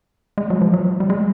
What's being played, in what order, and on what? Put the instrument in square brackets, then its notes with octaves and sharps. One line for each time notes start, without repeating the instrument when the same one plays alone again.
[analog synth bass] G#3
F#3
F3
F#3
G3
G#3